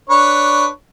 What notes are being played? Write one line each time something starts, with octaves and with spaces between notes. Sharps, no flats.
D4 B4 C#5